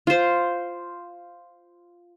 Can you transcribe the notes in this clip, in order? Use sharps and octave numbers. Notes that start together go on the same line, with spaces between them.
F4 C5